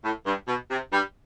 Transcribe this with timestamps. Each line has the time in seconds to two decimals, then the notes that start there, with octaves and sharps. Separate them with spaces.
0.04 A2
0.26 G2
0.48 B2
0.71 C3
0.92 G2 G3